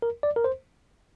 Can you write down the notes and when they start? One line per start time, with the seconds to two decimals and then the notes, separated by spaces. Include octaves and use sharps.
0.02 A#4
0.23 D5
0.36 A#4
0.44 C5